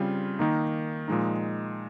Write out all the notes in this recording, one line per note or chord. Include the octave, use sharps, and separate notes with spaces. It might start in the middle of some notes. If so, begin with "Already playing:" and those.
Already playing: C#3 G3 C4 F4
D#3 A#3 D#4
A#2 F3 G#3 D#4